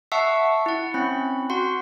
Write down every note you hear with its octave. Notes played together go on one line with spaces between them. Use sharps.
E5 F#5 A5 C#6 E6 C7
E4 F#5
C4 C#4 B5
F#4 F#5 C6